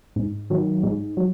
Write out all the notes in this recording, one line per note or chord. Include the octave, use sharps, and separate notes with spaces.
G#2
D#3 F#3
G#2
F#3